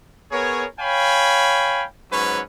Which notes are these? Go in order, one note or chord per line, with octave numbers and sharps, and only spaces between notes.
B3 G#4 A#4 C#5
C#5 F5 G5 G#5 B5
G#2 F#3 C#4 B4 C#5